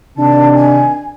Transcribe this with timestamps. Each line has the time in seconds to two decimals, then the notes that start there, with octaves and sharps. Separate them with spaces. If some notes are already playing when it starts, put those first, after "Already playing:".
0.17 C3 D#3 D4 A5
0.55 G#5